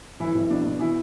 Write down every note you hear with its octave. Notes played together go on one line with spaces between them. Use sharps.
F1 E3 E4
F1
B2 D4
B2
E3 E4